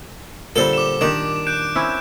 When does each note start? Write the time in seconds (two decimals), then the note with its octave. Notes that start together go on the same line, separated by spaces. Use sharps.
0.56 A#2 D3 G3 A4 C5
0.73 D6 E7
1.01 D#3 D4 G4
1.47 F#6 G6 D7
1.76 C4 C#4 E4